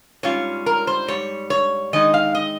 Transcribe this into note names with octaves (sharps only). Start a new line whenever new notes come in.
G#2 G3 C#4 F4 C#5
A#4
C5
G#2 G3 C#5
C#5
D#3 G#3 D#4 D#5
F5
D#5